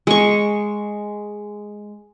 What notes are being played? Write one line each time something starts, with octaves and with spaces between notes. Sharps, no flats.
G#3 C#6